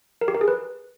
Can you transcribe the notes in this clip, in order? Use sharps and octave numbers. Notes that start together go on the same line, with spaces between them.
A#4
G4
A#4
G#4
B4